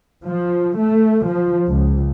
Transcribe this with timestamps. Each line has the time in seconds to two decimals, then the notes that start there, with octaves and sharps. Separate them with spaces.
0.24 F3
0.78 A3
1.28 F3
1.69 C#2